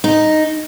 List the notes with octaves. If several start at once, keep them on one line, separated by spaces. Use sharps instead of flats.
D#4